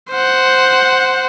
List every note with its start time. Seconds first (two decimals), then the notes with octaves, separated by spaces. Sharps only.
0.11 C5 F#5